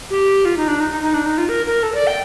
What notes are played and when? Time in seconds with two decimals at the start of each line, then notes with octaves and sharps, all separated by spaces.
0.10 G4
0.45 F4
0.57 D#4
0.68 D4
0.80 D#4
0.91 D#4
1.02 D#4
1.14 D4
1.26 D#4
1.38 F4
1.49 A#4
1.66 A#4
1.83 A4
1.94 D5
2.07 G5